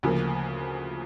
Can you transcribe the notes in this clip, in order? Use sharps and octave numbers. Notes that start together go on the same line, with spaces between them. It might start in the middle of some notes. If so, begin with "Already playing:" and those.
D2 C#3 F3 A#3